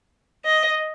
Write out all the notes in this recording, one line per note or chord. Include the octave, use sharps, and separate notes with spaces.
D#5